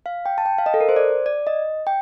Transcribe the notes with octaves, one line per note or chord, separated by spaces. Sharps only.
F5
G5
A5
G5
F5
D#5
A4
A#4
C5
D5
D5
D#5
G5